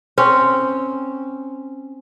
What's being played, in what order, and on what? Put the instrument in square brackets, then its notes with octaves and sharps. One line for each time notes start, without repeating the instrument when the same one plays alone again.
[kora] C4 C#4